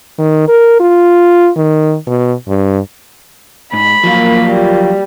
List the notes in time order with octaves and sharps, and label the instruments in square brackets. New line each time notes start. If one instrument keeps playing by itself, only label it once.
[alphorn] D#3
A#4
F4
D#3
B2
G2
[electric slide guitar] G#2 [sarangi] B5
[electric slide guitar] F3 F#3 F4 [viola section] A#3
[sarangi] G3